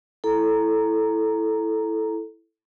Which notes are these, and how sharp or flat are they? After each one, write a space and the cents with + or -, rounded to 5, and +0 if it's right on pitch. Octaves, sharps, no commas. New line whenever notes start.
E4 +0 A4 -10 A#5 +0